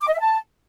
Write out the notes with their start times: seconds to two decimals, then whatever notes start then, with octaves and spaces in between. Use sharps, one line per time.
0.01 D6
0.07 D#5
0.13 E5
0.19 A5